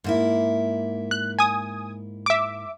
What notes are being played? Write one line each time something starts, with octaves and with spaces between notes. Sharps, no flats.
G#2 A#3 E4
F#6
G#5 D#6
E5 D6